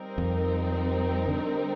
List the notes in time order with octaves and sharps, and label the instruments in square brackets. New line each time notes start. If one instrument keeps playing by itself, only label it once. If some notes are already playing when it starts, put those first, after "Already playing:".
Already playing: [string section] G3 C4 D#4 A#4
[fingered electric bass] F2
D3